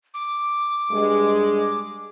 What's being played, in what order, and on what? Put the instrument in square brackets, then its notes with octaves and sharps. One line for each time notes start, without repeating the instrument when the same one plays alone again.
[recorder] D6
[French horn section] G2 G#3